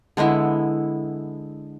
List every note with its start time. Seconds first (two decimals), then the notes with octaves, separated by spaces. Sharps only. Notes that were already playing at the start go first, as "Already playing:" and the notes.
0.17 D3 G#3 B3 E4